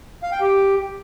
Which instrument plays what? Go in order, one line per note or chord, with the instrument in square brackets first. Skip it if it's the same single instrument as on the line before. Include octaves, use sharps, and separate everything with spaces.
[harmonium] F5
G5
G4